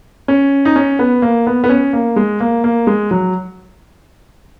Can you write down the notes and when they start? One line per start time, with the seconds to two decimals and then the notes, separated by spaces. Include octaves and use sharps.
0.28 C#4
0.65 D#4
0.76 C#4
0.99 B3
1.22 A#3
1.47 B3
1.64 B3
1.69 C#4
1.93 A#3
2.16 G#3
2.40 A#3
2.64 A#3
2.87 G#3
3.11 F#3